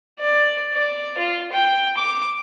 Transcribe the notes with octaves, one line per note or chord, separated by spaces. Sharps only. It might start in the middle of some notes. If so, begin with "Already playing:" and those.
D5
D5
F4
G5
D6